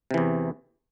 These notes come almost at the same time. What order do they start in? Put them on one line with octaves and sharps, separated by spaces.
C3 E3 E2